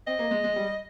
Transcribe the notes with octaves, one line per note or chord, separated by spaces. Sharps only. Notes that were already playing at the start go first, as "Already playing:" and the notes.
C4 D#5
A#3
G#3
G#3
G3